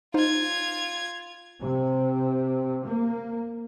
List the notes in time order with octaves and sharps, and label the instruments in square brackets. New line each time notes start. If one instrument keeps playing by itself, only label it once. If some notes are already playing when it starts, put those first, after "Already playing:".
[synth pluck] D#4 C5 F5 [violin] F4 G#6
[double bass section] C3
A#3